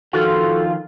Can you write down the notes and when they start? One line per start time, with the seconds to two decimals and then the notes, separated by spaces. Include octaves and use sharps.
0.13 D#3 F3 F4 F#4 A4